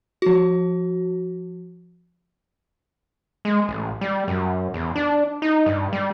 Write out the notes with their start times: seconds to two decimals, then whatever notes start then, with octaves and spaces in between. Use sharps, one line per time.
0.22 F3 F#4
3.45 G#3
3.68 A1
4.01 G3
4.28 F#2
4.74 E2
4.96 D4
5.42 D#4
5.66 G2
5.93 G3